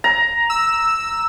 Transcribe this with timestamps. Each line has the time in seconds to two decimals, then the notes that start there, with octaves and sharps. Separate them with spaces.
0.04 A#5
0.50 E6